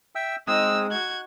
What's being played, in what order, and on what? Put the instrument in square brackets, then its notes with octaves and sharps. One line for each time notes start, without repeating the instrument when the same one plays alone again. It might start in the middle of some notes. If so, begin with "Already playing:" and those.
[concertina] E5 G5 E6
[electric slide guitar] G#3 [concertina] C4 D#6 [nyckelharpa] D#4 D#5 [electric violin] E6
[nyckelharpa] F#4 [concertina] F#6 [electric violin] G#6